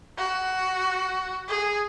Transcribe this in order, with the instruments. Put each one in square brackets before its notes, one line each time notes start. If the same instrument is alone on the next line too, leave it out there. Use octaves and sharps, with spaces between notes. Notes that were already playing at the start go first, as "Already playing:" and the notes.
[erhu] F#4
G#4